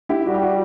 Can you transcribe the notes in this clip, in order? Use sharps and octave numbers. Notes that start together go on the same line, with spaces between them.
E4 G4
G3 F#4
G4
F#4